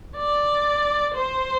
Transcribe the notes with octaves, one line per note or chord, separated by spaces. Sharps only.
D5
C5